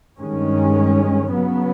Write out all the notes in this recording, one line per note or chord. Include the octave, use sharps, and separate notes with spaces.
G2 D#3 G#3 C#4
C#3 F#3 B3